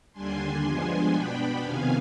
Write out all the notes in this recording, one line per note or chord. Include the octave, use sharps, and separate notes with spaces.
D#2 D3 G3 D4 G#5 C6
G2 F3 G#3 B3 D4
B2 B3 D4 G5 B5
F2 C3 D#3 B3 F5 G#5